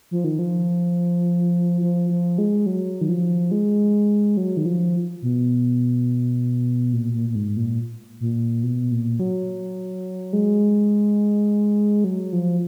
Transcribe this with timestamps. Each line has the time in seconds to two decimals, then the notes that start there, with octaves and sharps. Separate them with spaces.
0.11 F3
0.24 D#3
0.39 F3
1.81 F3
2.10 F3
2.38 G#3
2.66 F#3
3.01 D#3
3.09 F3
3.51 G#3
4.37 F#3
4.57 D#3
4.66 F3
5.22 B2
6.93 A#2
7.14 A#2
7.29 A#2
7.35 G#2
7.57 A#2
8.20 A#2
8.63 B2
8.92 A#2
9.20 F#3
10.33 G#3
12.04 F#3
12.33 F3